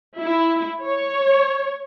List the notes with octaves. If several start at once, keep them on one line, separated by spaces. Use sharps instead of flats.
E4
C#5